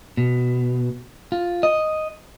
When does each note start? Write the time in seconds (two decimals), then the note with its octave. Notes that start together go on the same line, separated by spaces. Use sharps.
0.17 B2
1.32 F4
1.63 D#5